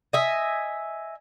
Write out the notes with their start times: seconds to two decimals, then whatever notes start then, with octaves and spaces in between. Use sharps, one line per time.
0.13 D#5 E5 G#5